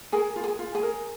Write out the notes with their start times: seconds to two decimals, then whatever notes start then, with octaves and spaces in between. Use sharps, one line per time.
0.12 G#4 A#4 G#5
0.36 F4
0.43 G#4 G#5
0.59 F4
0.75 G#4 G#5
0.83 A#4